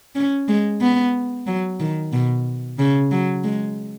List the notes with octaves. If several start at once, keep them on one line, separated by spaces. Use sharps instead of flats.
C#4
G#3
B3
F#3
D#3
B2
C#3
F#3
G#3